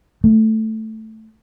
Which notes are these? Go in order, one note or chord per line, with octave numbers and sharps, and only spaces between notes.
A3